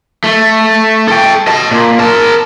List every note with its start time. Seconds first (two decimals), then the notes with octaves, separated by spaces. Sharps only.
0.24 A3
1.08 A4 G5
1.47 D#5 A5
1.71 A#2
1.99 A#4 A5